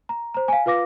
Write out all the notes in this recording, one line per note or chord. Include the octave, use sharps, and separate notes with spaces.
A#5
C5 A#5
F5 G#5
F4 B4 F5 D6 A#6